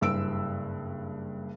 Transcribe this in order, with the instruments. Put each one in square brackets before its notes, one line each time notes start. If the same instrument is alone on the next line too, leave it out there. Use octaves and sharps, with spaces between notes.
[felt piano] F#1 G2 E6 D7